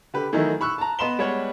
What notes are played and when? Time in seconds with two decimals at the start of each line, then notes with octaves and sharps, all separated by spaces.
0.14 D3 G4 B4
0.33 D#3 E3 F#3 A3 D#4 E4
0.61 B5 C#6 E6 F#6
0.78 A5 A#5
0.99 B3 D#5 B5 C6 E7 G7
1.19 G3 G#3 B3 C#5 F#5